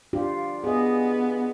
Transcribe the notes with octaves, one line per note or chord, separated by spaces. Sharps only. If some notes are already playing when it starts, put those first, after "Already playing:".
D4 F4 G4
B3 G#4 D#5